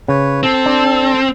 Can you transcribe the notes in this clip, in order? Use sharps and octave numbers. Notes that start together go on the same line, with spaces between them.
C#3 B4 C#5
C4 A4
D4